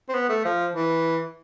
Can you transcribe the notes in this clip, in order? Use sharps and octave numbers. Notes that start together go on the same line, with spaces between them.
C4
B3
A3
F3
E3